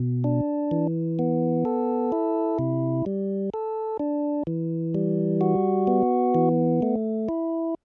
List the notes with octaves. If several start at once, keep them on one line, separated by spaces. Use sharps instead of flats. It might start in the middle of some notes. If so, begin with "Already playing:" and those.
Already playing: B2
D4
E3
B3
A4
E4
C3
G3
A4
D4
E3
G3
F#4
B3
E3
A3
E4